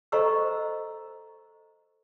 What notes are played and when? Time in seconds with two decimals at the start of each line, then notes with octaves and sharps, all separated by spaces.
0.12 A4 C5 D#5 A#5 C#6 E6